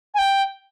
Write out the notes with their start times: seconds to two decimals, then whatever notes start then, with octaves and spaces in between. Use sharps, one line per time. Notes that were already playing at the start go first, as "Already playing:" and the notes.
0.15 G#5
0.18 G5